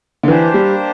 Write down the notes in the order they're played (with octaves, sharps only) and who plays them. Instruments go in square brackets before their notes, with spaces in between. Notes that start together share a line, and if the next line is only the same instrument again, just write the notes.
[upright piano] D3
[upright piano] E3 [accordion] A#3 D4 G4 C5
[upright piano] G3